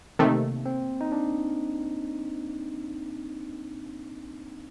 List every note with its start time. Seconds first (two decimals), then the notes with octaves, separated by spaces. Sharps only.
0.19 C3 D#3 A3 A#3
0.66 C4
1.01 D#4
1.12 D4